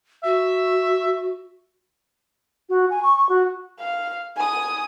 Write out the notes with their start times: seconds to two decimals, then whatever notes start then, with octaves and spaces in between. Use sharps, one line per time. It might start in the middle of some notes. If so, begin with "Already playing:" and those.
0.24 F#4 E5
2.69 F#4
2.90 G#5
3.03 C#6
3.16 C#6
3.29 F#4
3.79 F5
4.37 G#5 D#6